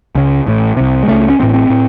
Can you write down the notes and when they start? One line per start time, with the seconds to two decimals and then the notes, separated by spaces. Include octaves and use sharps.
0.15 C#2 C#3
0.47 A1 A2
0.77 C2 C3
1.03 G#3
1.08 C#2 C#3 A3
1.30 C#4
1.40 A1 A2 C4
1.54 C4
1.70 A2